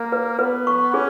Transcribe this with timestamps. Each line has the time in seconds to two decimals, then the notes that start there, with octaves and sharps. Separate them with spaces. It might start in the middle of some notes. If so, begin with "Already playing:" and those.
Already playing: A#3
0.12 B4
0.39 B3 B4
0.67 C#6
0.94 C#4 G#4